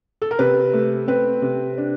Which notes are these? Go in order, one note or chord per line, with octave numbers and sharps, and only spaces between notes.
A4
A#4
C3 B4
A3
C4 B4
C3
D4